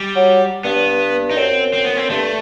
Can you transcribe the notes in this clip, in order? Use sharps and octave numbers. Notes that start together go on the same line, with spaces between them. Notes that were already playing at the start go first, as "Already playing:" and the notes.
Already playing: G3
F#3
G2 B3
D#4
F#2 C4
C4
B3
C4
F#2
G2 A3